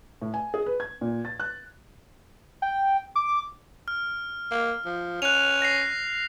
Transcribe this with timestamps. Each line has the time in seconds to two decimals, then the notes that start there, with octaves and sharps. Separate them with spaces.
0.22 A2
0.34 G#5
0.54 G#4
0.66 B4
0.80 G#6
1.01 A#2
1.25 A6
1.40 F#6
2.62 G5
3.16 D6
3.88 F6
4.51 A#3
4.85 F3
5.22 C#4 F#6 F7
5.62 A#6 C7